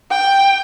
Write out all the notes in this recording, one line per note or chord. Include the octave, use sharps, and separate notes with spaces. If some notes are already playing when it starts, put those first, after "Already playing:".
G5